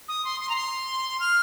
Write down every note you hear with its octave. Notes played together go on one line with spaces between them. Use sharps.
D#6
C6
C6
A#5
C6
F6